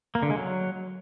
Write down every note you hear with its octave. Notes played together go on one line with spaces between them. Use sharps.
A#3
D3
G#3
F#3